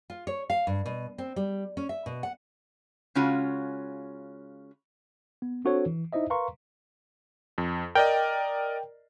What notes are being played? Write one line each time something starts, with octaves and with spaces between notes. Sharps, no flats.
F4
C#5
F5
G2
B2
C4
G3
C#4
E5
B2
F#5
C#3 G#3 C#4 F4 F#4
B3
C4 D4 F#4 A4 C5 C#5
E3
D#4 E4 C5 D#5 E5
A#4 B4 F5 A#5 C6 C#6
F2
A#4 D5 D#5 G5